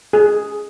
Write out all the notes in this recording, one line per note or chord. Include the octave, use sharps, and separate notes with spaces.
G#4